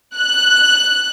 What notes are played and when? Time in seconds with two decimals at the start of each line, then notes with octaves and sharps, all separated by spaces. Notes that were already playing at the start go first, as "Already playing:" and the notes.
0.15 F#6